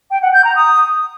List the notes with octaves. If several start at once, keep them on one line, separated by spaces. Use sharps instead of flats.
G5
F#5
G6
A#5
D#6